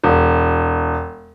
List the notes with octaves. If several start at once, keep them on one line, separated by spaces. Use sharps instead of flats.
E1